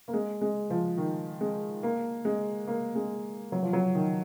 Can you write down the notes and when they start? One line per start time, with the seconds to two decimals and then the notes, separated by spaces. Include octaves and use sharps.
0.08 A#3
0.13 G#3
0.41 G#3
0.70 F3
0.97 D#3
1.41 G#3
1.83 A#3
2.25 G#3
2.68 A#3
2.95 G#3
3.52 F#3
3.62 F3
3.73 F#3
3.95 D#3